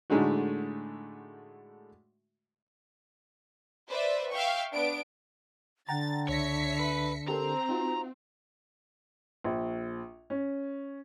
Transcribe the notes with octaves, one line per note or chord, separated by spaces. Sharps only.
A2 D3 G#3 A3 D#4 F#4
B4 C5 D5 E5
E5 F5 G5 C#6
B3 D4 D7
D3 F#5 G5 A#5 A6
C#2 C#5 E5 A#6 B6 C#7
B4
C4 G4 A4 A#4 A#5
D#4 F4 F#4
A#1
C#4